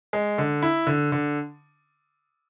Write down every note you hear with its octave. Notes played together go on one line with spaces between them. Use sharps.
G#3
D3
E4
D3
D3